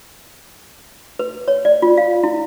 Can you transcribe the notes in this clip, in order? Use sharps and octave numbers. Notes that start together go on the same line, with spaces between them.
B4
C#5
D5
F4
F5
E4